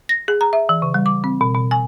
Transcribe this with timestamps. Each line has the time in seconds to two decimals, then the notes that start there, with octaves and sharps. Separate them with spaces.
0.09 A#6
0.28 G#4
0.41 A#5
0.53 E5
0.69 E3
0.82 C#3
0.94 G3
1.06 D6
1.24 C4
1.41 B2
1.55 B2
1.71 G#5